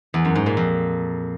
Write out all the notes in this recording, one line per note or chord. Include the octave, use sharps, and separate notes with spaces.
E2
F#2
G#2
A#2
F2